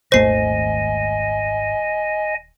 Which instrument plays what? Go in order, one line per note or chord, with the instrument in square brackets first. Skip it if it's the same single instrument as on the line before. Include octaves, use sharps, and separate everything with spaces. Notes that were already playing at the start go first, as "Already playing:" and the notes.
[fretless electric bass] D#1 D#2 A3 [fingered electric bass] G#1 [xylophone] C5 C7 [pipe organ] D#5 G#5